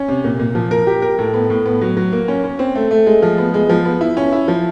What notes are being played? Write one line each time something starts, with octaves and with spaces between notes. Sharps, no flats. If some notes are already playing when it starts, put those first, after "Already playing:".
Already playing: C#4
C3
A#2
A#2
F3
A#4
G4
A#4
A2
B3
A2
B3
F#3
F#3
A#3
C#4
C#4
C4
A3
A3
G#3
F3
B3
G#3
F3
B3
E4
C#4
E4
F3